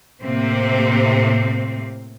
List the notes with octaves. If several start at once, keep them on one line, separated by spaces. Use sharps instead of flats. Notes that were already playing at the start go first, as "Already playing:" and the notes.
A2 C3 A#3 C4